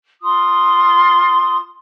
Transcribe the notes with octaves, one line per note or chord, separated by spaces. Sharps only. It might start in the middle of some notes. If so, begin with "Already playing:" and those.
F4 C6 D#6